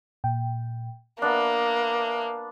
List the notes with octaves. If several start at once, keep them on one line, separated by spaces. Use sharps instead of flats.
A#2 G5
A#3 B3 D4 E5 A#5